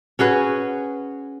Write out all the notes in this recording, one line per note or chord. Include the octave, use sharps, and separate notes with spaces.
C#4 F#4 G#4 B4